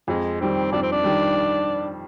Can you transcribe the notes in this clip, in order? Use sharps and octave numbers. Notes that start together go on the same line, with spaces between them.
F2 G#3
D#3 G3 C4
F2 D4
C4
D4
D#3 G3